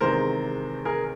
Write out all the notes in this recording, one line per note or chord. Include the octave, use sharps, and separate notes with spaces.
E2 C3 D#3 G#3 A#4 C5
G#4 A#4